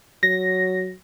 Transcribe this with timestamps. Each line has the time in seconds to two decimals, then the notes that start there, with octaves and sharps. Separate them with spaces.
0.23 F#3 A#6